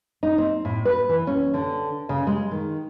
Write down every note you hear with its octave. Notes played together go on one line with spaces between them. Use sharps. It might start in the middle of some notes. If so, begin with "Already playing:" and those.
D#4
C4
A2
B4
E3
C#4
D3
C#3
G#3
D#3